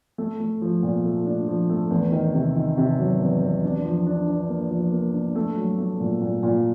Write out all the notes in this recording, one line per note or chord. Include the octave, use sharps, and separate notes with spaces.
A3
A3
F3
A#2
A3
D4
F3
A3
E2
D#3
C3
D#3
C3
F#3
E2
E2
D4
F3
D4
D4
A#3
F3
A#3
D4
A3
F#3
A3
A#2
A#2
A#2